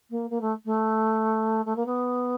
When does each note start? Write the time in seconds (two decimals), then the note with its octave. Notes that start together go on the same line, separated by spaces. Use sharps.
0.10 A#3
0.30 A#3
0.41 A3
0.65 A3
1.65 A3
1.76 A#3
1.86 B3